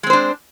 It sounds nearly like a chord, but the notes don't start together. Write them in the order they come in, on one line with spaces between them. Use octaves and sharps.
G#3 C4 C5 D4